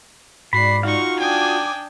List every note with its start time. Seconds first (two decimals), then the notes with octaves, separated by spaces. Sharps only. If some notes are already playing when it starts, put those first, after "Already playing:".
0.53 G#2 F#4 D5 B5 C7
0.83 D#4 F4 F#4 F5 C#6
1.20 D4 G5 G#5 D6 D#6